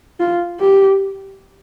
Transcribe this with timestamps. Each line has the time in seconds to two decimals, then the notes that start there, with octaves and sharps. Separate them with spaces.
0.20 F4
0.60 G4